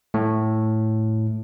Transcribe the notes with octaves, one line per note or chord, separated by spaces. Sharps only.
A2